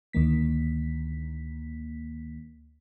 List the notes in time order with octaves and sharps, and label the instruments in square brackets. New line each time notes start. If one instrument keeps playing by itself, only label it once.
[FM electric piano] D2 D#3 A#3 B6